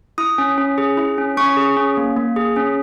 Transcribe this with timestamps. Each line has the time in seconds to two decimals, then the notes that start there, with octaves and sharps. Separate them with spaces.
0.18 E4 D#6
0.38 C#4
0.58 C#4
0.78 G#4
0.97 E4
1.18 C#4
1.37 C#4 C#6
1.57 G#4
1.77 C#4
1.97 A#3
2.17 A#3
2.36 G#4
2.56 C#4